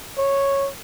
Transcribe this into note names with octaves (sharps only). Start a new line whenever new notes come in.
C#5